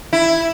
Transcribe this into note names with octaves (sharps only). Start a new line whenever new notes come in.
E4